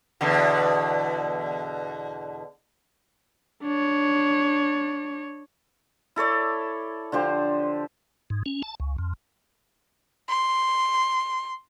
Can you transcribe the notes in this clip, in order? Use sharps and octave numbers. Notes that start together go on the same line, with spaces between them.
E2 B2 D3
D4 C#5
E4 A4 C#5 D5
D3 F3 G4 C5
G#2
C#4
A5
C#2
F2
C6